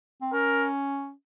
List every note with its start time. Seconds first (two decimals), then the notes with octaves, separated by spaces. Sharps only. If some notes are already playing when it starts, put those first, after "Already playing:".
0.21 C4
0.33 C#4 A#4